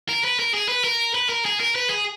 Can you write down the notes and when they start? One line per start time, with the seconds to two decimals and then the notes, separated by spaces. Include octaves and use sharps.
0.09 A#4
0.24 B4
0.39 A#4
0.54 G#4
0.69 B4
0.84 A#4
1.14 B4
1.29 A#4
1.45 G#4
1.60 A#4
1.75 B4
1.90 G#4